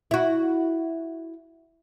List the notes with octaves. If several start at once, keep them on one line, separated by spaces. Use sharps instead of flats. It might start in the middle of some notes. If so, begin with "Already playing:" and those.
E4 F#4